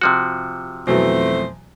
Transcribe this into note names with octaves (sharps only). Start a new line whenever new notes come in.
C3 F3 F#4
F2 B2 E3 F#3 A3 C5